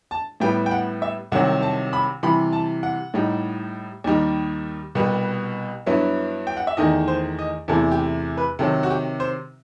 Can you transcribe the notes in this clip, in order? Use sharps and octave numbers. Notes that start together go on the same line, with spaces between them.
A5
A2 G3 B3 E4 G5
G5
F#5
E5
C2 C3 D#3 F#3 F#5
A5
B5
C3 E3 G3 B5
A5
F#5
A2 G3 D#4
D#2 D#3 G3 D#4
C2 B2 G3 B3
G2 F#3 B3 E4
G5
F#5
E5
E2 D#3 A3 D#4 D#5
C5
D#5
E2 C3 E3 A3 E4 A4
G4
B4
C3 D#3 F#3 A4
F#4
G4
C5